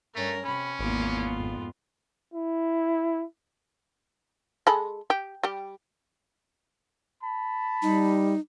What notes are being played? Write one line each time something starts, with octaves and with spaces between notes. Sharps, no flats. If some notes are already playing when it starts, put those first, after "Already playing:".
G2 A3 C#4 A#4
C3 C#4 B5
G#1 E2 A#3 B3 F4 D6
F2 G#2
E4
G#3 A4 B5
G4
G3 G4
A5 B5
G3 D#4